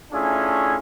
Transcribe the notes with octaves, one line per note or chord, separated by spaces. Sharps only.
A3 C#4 D4 E4 F4 G#4